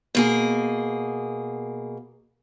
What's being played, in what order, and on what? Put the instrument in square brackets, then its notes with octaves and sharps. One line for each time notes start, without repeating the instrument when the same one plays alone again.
[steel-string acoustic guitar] B2 A#3 G#4